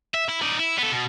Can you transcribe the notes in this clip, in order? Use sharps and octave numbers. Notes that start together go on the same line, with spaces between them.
E5
E4
D#4 D5
E4
B3 A4
B2